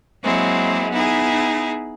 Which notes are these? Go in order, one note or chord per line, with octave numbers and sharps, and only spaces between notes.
F#3 G#3 A#3 C4 E4
B3 D#4 E4 G#4